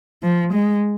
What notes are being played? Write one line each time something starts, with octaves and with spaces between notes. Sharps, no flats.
F3
G#3